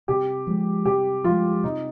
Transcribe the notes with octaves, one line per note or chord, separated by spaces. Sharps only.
C3 G4
F3 G#3
C3 G4
F3 G#3 F4
C3 D#4